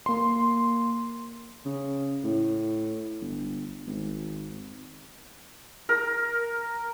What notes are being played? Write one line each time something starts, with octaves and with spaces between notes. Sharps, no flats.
A#3 C6
C#3
A2
G1
G#1
A#4